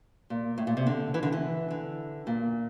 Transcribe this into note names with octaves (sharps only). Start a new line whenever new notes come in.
A#2
A2
A#2
C3
D3
E3
D3
E3
D3
A#2